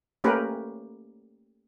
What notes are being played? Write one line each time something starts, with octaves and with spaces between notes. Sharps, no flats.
A3 A#3 C#4 G4 A#4 B4